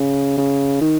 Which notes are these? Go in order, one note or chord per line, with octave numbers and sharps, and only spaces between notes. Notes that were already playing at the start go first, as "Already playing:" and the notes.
Already playing: C#3
C#3
D#3